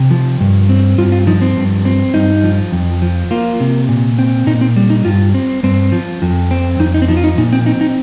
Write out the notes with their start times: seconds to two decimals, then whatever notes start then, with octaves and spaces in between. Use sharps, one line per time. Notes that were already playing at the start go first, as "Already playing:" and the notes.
Already playing: C3
0.11 F3
0.40 G2
0.69 C4
0.98 G2 F4
1.12 F4
1.27 F3 D#4
1.41 C4
1.57 G2
1.85 C4
2.14 G2 D#4
2.44 F3
2.72 F2
3.02 F3
3.31 A#3 F4
3.60 C3
3.89 A#2
4.19 C4
4.47 A#2 D#4
4.61 C4
4.76 G3
4.90 D#4
5.05 G2 F4
5.34 C4
5.63 G2 C4
5.92 F3
6.22 F2
6.51 C4
6.79 F2 D#4
6.94 D#4
7.02 C4
7.08 F3 D#4
7.17 F4
7.24 D#4
7.38 A#2 D#4
7.53 C4
7.66 C4 D#4
7.81 D#4